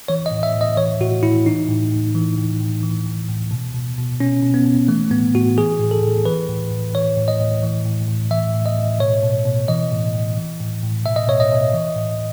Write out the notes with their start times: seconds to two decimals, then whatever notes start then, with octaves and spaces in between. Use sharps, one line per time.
0.08 E3 C#5
0.26 D#5
0.31 A2
0.43 E5
0.55 A2
0.61 D#5
0.77 E3 C#5
1.00 A2 F#4
1.23 A2 E4
1.46 E3 D#4
1.69 A2
1.91 A2
2.15 E3
2.38 A2
2.60 A2
2.83 E3
3.06 A2
3.29 A2
3.51 B2
3.74 B2
3.98 B2
4.20 B2 C#4
4.42 B2
4.54 B3
4.65 B2
4.88 E3 A3
5.11 A2 B3
5.34 A2 F#4
5.57 E3 G#4
5.79 A2
5.91 A4
6.03 A2
6.25 E3 B4
6.49 A2
6.71 A2
6.95 E3 C#5
7.17 A2
7.28 D#5
7.40 A2
7.63 E3
7.86 A2
8.08 A2
8.31 E3 E5
8.54 A2
8.66 D#5
8.77 A2
9.00 B2 C#5
9.23 B2
9.45 B2
9.68 E3 D#5
9.92 A2
10.14 A2
10.37 E3
10.60 A2
10.83 A2
11.06 B2 E5
11.16 D#5
11.28 B2 C#5
11.40 D#5
11.52 B2
11.73 E3
11.96 A2